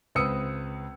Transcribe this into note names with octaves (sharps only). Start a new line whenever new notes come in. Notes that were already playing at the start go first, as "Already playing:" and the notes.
C#2 C4 B4 D#6 E6 C#7